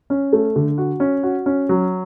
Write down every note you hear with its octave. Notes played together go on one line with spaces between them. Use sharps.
C#4
A3
D3
F#4
C#4
F#4
C#4
F#3